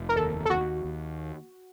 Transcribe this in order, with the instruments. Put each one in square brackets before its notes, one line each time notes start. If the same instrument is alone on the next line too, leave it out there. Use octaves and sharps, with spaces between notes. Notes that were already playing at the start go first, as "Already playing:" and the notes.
Already playing: [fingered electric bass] F1
[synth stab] A#4
[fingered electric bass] D#2 [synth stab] A4
[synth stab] A4
[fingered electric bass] D#2 [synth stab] F#4
[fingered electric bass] D#2